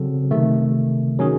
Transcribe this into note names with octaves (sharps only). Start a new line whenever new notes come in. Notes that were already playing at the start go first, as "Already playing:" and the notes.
Already playing: C#3 F#3 C4 F#4 A4
C3 D#3 A3
D#3 F#3 C#4 G#4